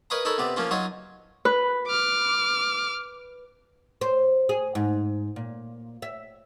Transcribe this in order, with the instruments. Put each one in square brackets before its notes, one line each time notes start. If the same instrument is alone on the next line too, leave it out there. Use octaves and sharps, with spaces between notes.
[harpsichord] A#4 B4 C#5 D#5 F5 A#5
D#4 A4 A#4 C#5 B5
C3 B3 D5
F3 A#3 C#4 F4
F#3 D#4 F4 C#5 D#5
[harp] B4
[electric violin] D6 F6
[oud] C5
G#4
G#2
A#2
E5